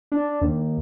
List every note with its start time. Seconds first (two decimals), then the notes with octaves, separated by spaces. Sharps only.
0.12 D4
0.42 D#2